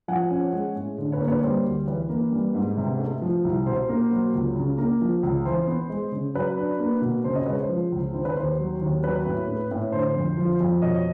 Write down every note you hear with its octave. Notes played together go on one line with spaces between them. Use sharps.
F3 F#5 G#5
C#4
G#3
A2
D3
B4 C#5
A#3
B4 C#5
G3 C5
D2
E3 B4
A#3
G3
G#2
C3
A3
F3
C2
B2 C5
A#3
F#3
C#2
C#3
A#3
F3
C#2
E3 C5
B3
G#3
C#3
F#3 B4
D4
A#3
B2
C#3 C5
C#5 D#5
G#3 B4 C#5
C5
F3
C#2
D#3 C5
B4
D#2 C5
F#3
D#2
F#3 B4
A2
A3
A2
D3 C5
F2
F3
F2
B2 C#5 D#5